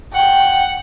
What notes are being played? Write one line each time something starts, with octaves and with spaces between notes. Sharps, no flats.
F#5 G5